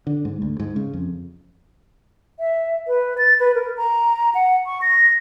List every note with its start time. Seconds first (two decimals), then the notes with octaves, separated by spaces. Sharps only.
0.07 D3
0.25 G#2
0.42 D2
0.60 G#2
0.76 C#3
0.93 F2
2.39 E5
2.87 B4
3.18 A6
3.40 B4
3.55 A#4
3.77 A#5
4.34 F#5
4.66 C#6
4.82 A#6